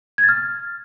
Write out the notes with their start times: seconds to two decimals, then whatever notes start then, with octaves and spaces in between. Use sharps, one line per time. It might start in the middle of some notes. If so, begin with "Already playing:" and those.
0.18 G#6
0.23 A6
0.29 F6